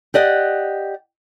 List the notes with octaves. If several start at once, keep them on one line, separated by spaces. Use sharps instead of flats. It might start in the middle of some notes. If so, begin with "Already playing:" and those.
G4 D5 D#5 F#5